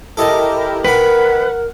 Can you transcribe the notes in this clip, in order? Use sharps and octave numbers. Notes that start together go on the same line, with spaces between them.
E4 G4 A4 A#4 D#5 A5
D#3 A#4 B4 F#5 B5